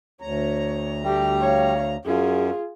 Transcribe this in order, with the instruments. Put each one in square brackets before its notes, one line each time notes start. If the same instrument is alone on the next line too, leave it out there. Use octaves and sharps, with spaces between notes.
[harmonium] D2 A#5 [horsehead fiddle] C#5
[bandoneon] G3 [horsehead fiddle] A3 G4
[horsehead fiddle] C#5 F5
[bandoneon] F#2 [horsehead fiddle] F4 G#4